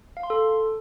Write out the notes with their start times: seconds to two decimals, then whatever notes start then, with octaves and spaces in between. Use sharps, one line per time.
0.17 F5
0.23 C6
0.30 A4